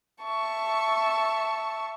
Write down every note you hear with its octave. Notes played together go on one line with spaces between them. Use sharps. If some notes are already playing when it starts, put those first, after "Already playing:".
E5 A5 C#6